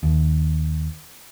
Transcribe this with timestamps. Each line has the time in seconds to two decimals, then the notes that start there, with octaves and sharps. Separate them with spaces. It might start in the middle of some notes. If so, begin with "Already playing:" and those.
0.03 D#2